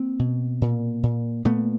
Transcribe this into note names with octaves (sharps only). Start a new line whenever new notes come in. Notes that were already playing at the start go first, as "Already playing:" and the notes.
Already playing: A#3 C4
B2
A#2
A#2
A#2 A3 B3